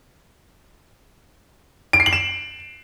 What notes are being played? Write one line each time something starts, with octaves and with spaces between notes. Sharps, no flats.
D7
C7
F#7
E7